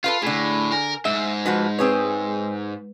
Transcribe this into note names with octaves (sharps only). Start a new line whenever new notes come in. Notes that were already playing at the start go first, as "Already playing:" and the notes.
F4 A4 B4 F5
A2 D3 G#4
A#4 G#5
G#2 E5
F3 G#3 F#4 B4
C4 G#4 B4 C#5